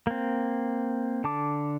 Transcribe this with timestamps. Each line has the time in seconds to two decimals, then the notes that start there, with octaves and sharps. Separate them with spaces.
0.07 A#3 C4
1.24 D3 A5 D6